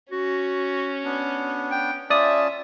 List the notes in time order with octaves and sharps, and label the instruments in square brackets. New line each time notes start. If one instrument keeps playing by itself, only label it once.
[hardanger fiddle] C#4 [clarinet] F#4
[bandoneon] B3 D4
[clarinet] G5
[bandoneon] C#4 F4 A5 [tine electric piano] D5 D#6 [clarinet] E5